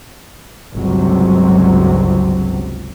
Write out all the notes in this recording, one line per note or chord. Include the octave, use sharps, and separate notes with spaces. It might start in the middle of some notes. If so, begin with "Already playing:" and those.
G1 C#2 C3 F#3